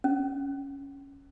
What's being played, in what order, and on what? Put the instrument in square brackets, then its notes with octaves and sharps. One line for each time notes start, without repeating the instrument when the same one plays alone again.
[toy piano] C#4